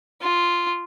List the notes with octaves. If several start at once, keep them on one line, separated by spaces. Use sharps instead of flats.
F4